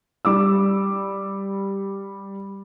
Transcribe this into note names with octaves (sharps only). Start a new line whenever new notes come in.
G3 D6 E6